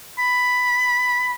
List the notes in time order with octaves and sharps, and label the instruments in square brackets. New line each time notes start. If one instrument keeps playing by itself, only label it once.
[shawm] B5